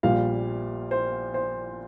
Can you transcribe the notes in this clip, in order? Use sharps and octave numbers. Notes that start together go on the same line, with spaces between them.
A#1 A#2 G3 F5
C5
C5